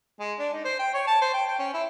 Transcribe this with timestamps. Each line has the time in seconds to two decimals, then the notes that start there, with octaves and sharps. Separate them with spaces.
0.20 G#3
0.39 D4
0.53 D#4
0.65 C5
0.79 G5
0.94 C#5
1.07 A5
1.22 C5
1.34 G5
1.48 G5
1.59 C#4
1.74 E4